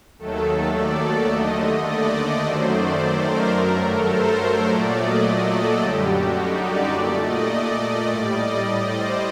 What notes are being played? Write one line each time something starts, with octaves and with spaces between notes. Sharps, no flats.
D#2 D#3 F#3 A3 A4
D5
D#2 D3 A3 D#5
D5
D5
F#2 D#3 F#3 A3 C5
D5
D5
A#4
G2 F#3 A3
A4
C5
C5
A#2 F#3 A3 D5
D#5
D5
A4
F#2 D3 G3 G4
F#4
D#4
D5
A#2 A3
D#5
D5
D#5
A2 G3 D5
D#5
D5
C5